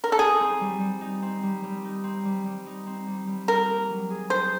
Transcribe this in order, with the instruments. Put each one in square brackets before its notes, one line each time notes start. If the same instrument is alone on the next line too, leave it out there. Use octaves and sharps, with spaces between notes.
[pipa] A#4
A4
[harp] D#4 [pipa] G#4
[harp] C4
G3
G3
D#4
C4
G3
G3
D#4
C4
G3
G3
D#4
C4
G3
G3
[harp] D#4 [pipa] A#4
[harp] A#3
F#3
G#4
[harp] D#4 [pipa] C5